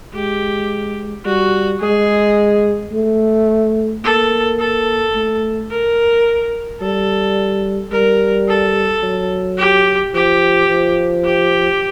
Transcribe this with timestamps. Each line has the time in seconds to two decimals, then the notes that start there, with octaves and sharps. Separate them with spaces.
0.15 G#3 G4
1.25 G3 F#4
1.81 G#3 G#4
2.92 A3
4.04 A#3 A4
4.60 A4
5.14 A3
5.70 A#4
6.81 G3 A4
7.92 G3 A#4
8.48 A4
9.03 F#3
9.58 G4
10.14 F3 G4
10.70 F3
11.25 G4